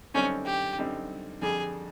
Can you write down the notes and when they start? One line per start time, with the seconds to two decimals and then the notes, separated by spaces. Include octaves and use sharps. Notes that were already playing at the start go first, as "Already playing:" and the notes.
0.14 F#2 D3 G3 C4 C#4 D#4
0.46 G4
0.78 F#2 D3 G3 C4 D#4
1.42 F2 D3 G3 G#4